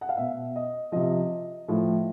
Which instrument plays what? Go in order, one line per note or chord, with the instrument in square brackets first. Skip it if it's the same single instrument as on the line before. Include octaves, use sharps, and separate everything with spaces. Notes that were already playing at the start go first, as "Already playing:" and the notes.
[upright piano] F#5
F5
B2 E5
D#5
C3 F3 D#5
A2 F3